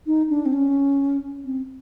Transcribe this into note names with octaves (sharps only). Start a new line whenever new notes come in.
D#4
D4
C4
C#4
C4